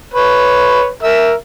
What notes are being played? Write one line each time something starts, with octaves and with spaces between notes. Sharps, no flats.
B4 C#5
A#4 E5